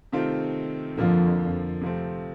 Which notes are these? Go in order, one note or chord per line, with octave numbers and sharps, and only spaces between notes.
C3 D#3 A3 C4 F4
F2 D3 F3 A#3 F4
C3 F3 A3 C4